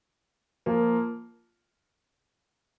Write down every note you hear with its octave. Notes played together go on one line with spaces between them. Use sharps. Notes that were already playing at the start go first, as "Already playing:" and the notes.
F3 A#3 F4